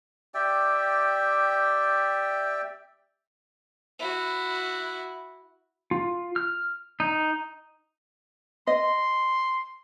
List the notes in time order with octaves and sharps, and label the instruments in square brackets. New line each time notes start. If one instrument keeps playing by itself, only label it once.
[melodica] G4 D5 E5 G5
[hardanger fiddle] E4 F#4
[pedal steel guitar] F4
F6
D#4
[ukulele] D#5 [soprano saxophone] C6